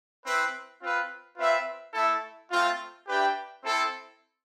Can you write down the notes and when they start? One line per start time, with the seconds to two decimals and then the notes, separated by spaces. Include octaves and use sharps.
0.24 C4 E4 B4
0.80 C4 F4 B4
1.37 C4 F4 B4 E5
1.94 A3 E4 A4 E5
2.50 A3 C4 F4
3.07 D4 G4 B4 E5 G5
3.63 C4 E4 A4